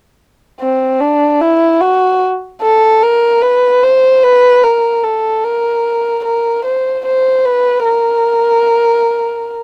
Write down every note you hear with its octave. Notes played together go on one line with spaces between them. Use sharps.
C4
D4
E4
F#4
A4
A#4
B4
C5
B4
A#4
A4
A#4
A#4
C5
C5
B4
A#4